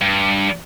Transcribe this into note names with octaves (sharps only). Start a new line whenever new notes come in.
G2